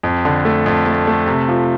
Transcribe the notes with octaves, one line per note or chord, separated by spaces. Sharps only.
F2
D3
A3
F2
A3
A3
C3
F3